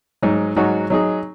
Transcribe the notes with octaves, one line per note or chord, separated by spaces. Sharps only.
G#2 F#3 D#4
G#2 F#3 D#4 F#4
F#3 D#4 G#4